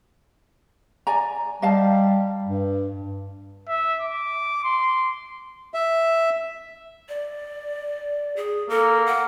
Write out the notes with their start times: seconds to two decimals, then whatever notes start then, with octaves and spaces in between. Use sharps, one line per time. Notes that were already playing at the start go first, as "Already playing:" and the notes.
1.07 D5 G#5 A#5
1.62 G3 D#5 F5 A5
2.44 G2
3.68 E5
4.01 D6
4.64 C6
5.74 E5
7.09 D5
8.36 G#4
8.70 A#3 A4
9.06 F#5